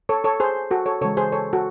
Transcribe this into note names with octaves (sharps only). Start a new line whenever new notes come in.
A4 C#5
A4 C#5
G#4 C5
F#4 A4
A4 C#5
C#3 E3 G#3 A4 C#5
G#4 C5
A4 C#5
F#4 A4